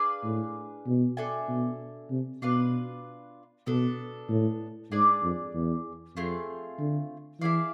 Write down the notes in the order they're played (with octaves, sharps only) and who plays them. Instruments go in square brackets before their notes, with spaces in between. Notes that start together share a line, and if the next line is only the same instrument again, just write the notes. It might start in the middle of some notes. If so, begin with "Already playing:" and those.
Already playing: [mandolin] D4 G#4 B4 F5
[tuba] A2
B2
[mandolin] D4 A4 E5 G#5
[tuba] B2
C3
[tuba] B2 [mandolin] D4 F4 B4
[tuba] B2 [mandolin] B3 D4 A4
[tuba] A2
[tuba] G#2 [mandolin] D4 G#4 D5
[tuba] F2
E2
[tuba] F2 [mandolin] A3 C4 F4 G#4
[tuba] D3
[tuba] E3 [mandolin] E4 G#4 D5 F5